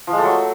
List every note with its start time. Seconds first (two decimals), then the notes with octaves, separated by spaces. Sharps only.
0.07 F3
0.13 G#3
0.18 A3
0.23 F#3